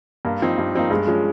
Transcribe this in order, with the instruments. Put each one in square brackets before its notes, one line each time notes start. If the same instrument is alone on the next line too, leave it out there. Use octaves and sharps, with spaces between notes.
[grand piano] G2 [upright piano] A#3
[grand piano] F3 C4 D#4
G2
[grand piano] F3 C4 D#4 [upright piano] A#3
[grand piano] G2 [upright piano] G#3
[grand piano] F3 G#3 C#4